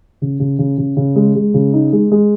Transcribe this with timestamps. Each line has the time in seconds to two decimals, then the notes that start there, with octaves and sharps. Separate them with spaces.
0.22 C#3
0.40 C#3
0.59 C#3
0.78 C#3
0.97 C#3
1.16 G#3
1.35 G#3
1.54 C#3
1.73 D#4
1.93 G#3
2.12 G#3